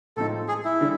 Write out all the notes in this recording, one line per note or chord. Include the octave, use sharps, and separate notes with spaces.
A2 F3 G#3 C4 D#4 A4
G#4
E4
D3 G3